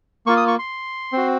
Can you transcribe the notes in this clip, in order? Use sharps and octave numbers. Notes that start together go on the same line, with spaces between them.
A#3 F4 C#6
D#6
C#6
C6
C4 F#4